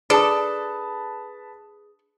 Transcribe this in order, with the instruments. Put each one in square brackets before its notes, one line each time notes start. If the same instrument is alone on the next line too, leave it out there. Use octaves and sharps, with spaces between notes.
[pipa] D4 A4 [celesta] G#4 D#6 [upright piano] B4 A5